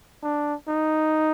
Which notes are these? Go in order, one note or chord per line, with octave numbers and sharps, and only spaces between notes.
D4
D#4